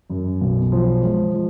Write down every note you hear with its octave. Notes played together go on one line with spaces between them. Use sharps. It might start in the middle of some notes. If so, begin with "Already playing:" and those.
F#2
B1
F3
G#3
F3